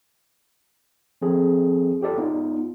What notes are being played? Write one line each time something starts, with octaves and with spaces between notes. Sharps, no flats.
F3 C4 G#4 A4
F4 G4 A4 D5
B3 D#4 F4